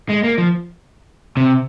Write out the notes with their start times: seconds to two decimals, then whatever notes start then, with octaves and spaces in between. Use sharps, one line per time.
0.10 G#3
0.24 A#3
0.38 F3
1.37 C3